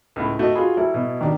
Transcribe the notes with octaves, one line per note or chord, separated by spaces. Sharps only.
C#2 A2
A3 F#4 D#5
F4 F#4 G#4 B5
F#3 G3 E4 A4
B2
D#3 D4 G4